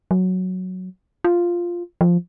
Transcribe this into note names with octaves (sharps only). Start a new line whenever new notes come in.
F#3
F4
F3